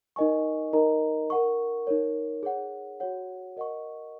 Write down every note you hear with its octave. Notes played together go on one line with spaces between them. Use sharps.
D#4 A#4 D#5 G#5 C#6
D#4 A#4 D#5 A#5
A#4 F#5 C#6
D#4 A#4 C#5
G#4 C#5 F#5
F#4 C#5 F#5
A#4 D#5 F#5 C#6